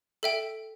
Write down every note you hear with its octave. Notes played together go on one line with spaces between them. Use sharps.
A4 E5 G5